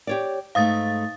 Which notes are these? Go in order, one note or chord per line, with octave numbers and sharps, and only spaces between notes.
G4 C#5 D5
G#2 A3 F5 D#6 A6